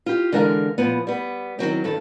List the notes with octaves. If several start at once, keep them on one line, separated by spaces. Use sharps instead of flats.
F4 G4
D3 E3 G#3 A#4 E5 F5
A#2 F3 B3
G3 B3
D#3 E3 F#3 C4
G2 D#3 A4